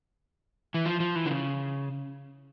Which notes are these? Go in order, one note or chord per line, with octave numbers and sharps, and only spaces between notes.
E3
F3
F3
E3
D3
C#3